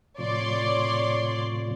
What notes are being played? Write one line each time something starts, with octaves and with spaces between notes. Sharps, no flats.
A2 C3 F3 C#5 D5 C6